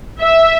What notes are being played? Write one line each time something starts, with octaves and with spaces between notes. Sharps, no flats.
E5